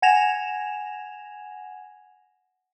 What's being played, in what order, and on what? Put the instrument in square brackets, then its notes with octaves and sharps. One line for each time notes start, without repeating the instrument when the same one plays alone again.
[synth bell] F#5 G#5 G#6 A#6 E7 F7